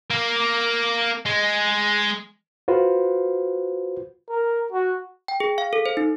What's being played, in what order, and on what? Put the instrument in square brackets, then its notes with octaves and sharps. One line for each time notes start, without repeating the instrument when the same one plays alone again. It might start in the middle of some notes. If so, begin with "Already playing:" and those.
[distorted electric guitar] A#3
G#3
[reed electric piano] F4 F#4 B4 C5
[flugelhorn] A#4
F#4
[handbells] G5
G#4
F5
A4
C5
D#4